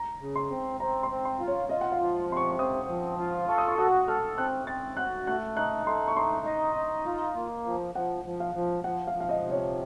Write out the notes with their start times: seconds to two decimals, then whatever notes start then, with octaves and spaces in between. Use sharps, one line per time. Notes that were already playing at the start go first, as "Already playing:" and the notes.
Already playing: A#5
0.21 C#3
0.36 C6
0.50 C4
0.80 C4 A#5
1.03 C6
1.10 C4
1.25 C6
1.40 F4
1.48 C#5
1.69 F4 D#5
1.81 F#5
1.92 F5
1.99 F3
2.29 C3 C6
2.37 C#6
2.51 C#6
2.59 C4 D#6
2.89 F3
3.18 F4
3.48 A4 C#6
3.58 D#6
3.68 C#6
3.78 F#4 D#6
4.08 A4 F6
4.38 C4 F#6
4.67 C4 A6
4.97 F#4 F#6
5.27 A3 F#6
5.57 D#4 F#6
5.86 A3 C6
6.08 C#6
6.16 D#4 C6
6.46 D#5
6.76 D#4
7.06 F4
7.36 A#3
7.65 F3
7.95 F3 F#5
8.25 F3
8.40 F5
8.55 F3
8.84 F3 F#5
9.07 F5
9.14 F3
9.20 F5
9.29 D#5
9.43 C3
9.52 C#5